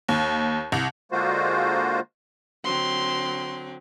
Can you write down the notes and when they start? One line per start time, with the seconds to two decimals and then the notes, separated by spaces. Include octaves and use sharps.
0.09 D#2
0.72 C2
1.12 D3 G#3 A#3 F4 F#4 C5
2.65 D3 F#3 C4 C6